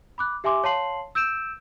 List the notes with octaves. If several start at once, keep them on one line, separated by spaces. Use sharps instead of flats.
B5 D6 F#6
G4 E5 G#5 C6 D6
C#5 F5 A5 C6 C7 F#7
E6 G6 D7 E7